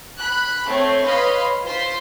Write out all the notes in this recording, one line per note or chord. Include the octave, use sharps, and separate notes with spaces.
B5 F#6
A3 C4 C#5
B4 C#5 D#5 F5 B5 C6
F4 C5 C6 B6